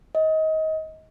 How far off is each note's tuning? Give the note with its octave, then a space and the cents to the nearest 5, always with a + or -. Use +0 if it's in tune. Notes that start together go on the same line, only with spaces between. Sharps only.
D#5 +25